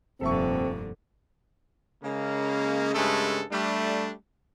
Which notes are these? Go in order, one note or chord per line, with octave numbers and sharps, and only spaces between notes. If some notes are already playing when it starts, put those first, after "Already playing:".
F1 G2 A#2 D3 C4 A4 E5 C#6
C#3 G#3 A#3
G2 C#3 G#3 A3 G#4 A4
G3 A3 D4